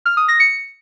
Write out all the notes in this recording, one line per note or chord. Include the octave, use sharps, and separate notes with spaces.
F6
D#6
A#6
C#7